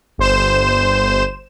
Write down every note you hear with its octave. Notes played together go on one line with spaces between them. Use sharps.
G1 C5 E7